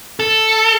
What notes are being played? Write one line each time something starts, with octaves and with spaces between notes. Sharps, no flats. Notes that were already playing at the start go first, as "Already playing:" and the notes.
A4